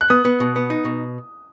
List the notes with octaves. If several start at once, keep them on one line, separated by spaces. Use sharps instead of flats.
F#6
B3 D#6
B3
B2
B3
D#4
B2